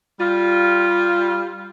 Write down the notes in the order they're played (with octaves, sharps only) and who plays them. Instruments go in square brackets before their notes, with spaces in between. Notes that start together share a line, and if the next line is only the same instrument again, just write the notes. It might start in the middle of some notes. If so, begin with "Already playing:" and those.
[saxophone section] G3 F4